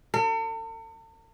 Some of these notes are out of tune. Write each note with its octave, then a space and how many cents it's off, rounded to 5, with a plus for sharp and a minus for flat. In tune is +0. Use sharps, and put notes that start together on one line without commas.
A4 +45